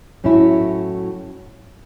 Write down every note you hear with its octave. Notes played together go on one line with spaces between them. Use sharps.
A2 F#3 C#4 E4